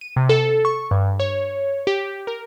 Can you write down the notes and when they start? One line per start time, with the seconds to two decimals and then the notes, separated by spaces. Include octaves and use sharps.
0.01 D#7
0.16 C3
0.29 A4
0.65 C#6
0.91 G2
1.20 C#5
1.87 G4
2.27 A#4